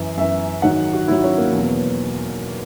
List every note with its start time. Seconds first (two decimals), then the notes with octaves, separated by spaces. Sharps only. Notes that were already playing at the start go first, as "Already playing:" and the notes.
Already playing: F#2 E3
0.17 F#2 E3 E5
0.62 G#2 D#3 F#3 F#5
0.93 F#4
1.08 G#2 D#3 F#3 E4
1.24 C#4
1.38 A#3
1.53 E2 B2 F#3